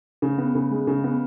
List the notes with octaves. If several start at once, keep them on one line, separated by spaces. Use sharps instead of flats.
C#3
B3
C#3
G#3
C#3
B3